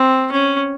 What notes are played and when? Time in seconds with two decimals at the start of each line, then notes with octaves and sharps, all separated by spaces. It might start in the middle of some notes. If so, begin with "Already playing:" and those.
Already playing: C4
0.31 C#4